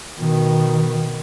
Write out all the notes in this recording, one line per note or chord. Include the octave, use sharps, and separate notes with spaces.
B2 D#3